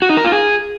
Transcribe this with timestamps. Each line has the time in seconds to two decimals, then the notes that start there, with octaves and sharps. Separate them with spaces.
0.02 F#4
0.09 D#4
0.17 A#4
0.24 F4
0.32 G#4